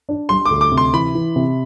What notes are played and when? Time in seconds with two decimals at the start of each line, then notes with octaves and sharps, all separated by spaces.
0.09 D4
0.29 G3 C6
0.46 D6
0.51 D2
0.61 D6
0.72 C3
0.78 C6
0.94 E3 B5
1.15 E3
1.36 C3